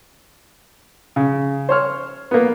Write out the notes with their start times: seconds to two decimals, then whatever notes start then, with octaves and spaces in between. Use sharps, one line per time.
1.16 C#3
1.69 C5 C#5 F6
2.31 A#3 B3